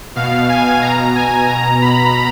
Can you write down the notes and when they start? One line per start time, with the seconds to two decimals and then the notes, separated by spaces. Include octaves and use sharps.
0.16 B2 F5
0.49 G#5
0.82 B2 A#5
1.15 G#5
1.48 B2 A#5
1.82 B5